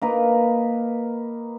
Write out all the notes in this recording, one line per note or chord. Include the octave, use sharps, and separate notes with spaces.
A#3 D#4 A#4 B4